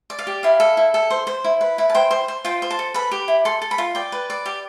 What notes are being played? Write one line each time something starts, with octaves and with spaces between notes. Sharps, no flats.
D5
F5
G4
E4 F5
A4
E4
A4
C5
C5
E4
B4
E4
A5
C5 G5
C5
C5
F4 G5
C5
A5
A4
B4 B5
G4
E4
A4 C6
A4
B5
F4
D5 G5
B4
D5
G4